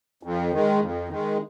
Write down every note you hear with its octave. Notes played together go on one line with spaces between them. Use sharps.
F2
D#3 G#3
F2
D#3 G#3